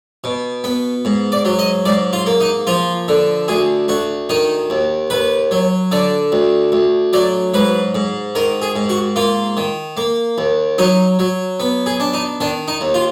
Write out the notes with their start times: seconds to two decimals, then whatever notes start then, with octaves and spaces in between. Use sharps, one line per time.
0.24 B2
0.64 B3
1.05 G#2
1.32 D5
1.45 F#3
1.59 D#5
1.85 G#2 D5
2.13 F4
2.26 A#3
2.40 D#4
2.67 F3 F4
3.08 D3
3.48 D2 G#4
3.88 D2 F#4
4.29 D#3 D#4
4.70 D#2
5.10 D#2 B4
5.51 F#3
5.92 D3 D5
6.32 D2
6.72 D2
7.13 F#3 D5
7.54 G#2 B4
7.95 G#2
8.35 D#3 A#4
8.62 G#4
8.76 G#2
8.89 F#4
9.16 A#3 F4
9.57 D#3
9.97 A#3
10.38 D#2
10.78 F#3 D#4
11.19 F#3
11.60 B3
11.86 G#4
12.00 D4
12.14 D#4
12.40 D#3 D4
12.68 D#4
12.81 D#2
12.94 F4